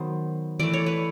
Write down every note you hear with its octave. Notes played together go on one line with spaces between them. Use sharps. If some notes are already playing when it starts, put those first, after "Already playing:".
Already playing: D#3 F#3 B3 C5
E3 A3 D5
C#5
B4